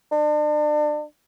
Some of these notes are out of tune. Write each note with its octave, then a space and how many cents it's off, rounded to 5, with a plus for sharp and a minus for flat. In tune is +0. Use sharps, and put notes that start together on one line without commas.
D4 +35